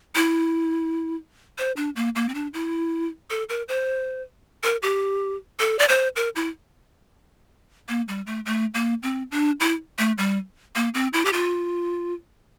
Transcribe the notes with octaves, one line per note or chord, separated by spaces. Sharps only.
E4
C5
D4
A#3
A#3
C4
D4
E4
A4
A#4
C5
A#4
G4
A4
D5
C5
A#4
E4
A#3
G3
A3
A3
A#3
C4
D4
E4
A3
G3
A#3
C4
E4
G4
F4